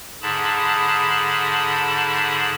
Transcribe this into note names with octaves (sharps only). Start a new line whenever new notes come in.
G#2 D3 G#4 A5 B5